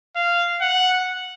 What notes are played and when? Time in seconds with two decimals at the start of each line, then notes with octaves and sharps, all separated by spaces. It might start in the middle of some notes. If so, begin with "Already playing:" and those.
0.16 F5
0.61 F#5